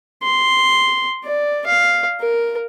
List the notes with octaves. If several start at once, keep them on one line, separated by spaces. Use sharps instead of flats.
C6
D5
F5
A#4